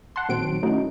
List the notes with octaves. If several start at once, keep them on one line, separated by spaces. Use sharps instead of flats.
F#5 A5 C6
A#1 D#3 F#3 C4 D7
A3 C#4 D#4 E4 F#4